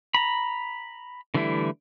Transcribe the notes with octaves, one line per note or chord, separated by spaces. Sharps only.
A#5 B5
D3 E3 G3 A3 E4